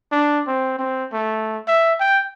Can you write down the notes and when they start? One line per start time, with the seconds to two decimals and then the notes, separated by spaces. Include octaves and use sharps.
0.12 D4
0.47 C4
0.79 C4
1.12 A3
1.68 E5
2.00 G5